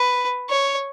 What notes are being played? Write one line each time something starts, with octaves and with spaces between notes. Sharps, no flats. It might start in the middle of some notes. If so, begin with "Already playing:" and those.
Already playing: B4
C#5